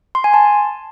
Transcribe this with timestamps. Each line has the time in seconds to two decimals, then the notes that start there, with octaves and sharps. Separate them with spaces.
0.15 C6
0.24 G#5
0.34 A5